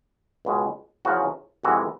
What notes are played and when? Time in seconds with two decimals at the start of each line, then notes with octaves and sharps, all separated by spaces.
0.45 C#2 B2 G#3
1.05 E2 C#3 F3 F#4
1.63 F2 C3 E3 G#3 F#4